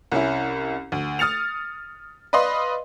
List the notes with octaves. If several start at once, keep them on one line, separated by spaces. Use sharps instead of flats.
C2 C#4 E4
D2
D#6 F6 A6 C#7 F7
B4 D5 D#5 F5 C6